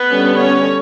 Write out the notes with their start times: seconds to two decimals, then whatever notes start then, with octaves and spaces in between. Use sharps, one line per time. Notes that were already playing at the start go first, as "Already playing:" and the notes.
Already playing: B3 B4
0.10 D3 G3 C#4
0.39 C#4 C#5